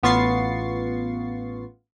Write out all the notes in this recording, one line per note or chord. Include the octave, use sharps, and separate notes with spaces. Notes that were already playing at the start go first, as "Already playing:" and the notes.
A1 B3 F4 C#6 A6 C7